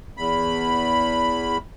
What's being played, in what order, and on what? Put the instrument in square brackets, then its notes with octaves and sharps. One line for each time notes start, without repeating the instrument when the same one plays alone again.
[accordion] E2 B5